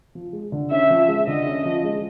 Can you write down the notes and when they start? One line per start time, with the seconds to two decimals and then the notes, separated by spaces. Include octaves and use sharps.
0.15 F3
0.33 G#3
0.52 D3
0.71 C#4 E5
0.90 F3
1.08 G#3
1.27 D3 D#5
1.47 C#4
1.65 F3
1.85 G#3